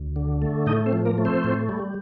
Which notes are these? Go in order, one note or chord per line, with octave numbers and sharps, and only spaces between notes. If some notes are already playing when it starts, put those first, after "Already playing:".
Already playing: D2
D3
A3
A2 D#4 D#5
C4 C5
F3
A#3 A#4
A3
C4 C5
A2
G3